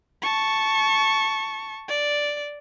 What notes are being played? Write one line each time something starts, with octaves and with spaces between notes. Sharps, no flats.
A5 C#6
D5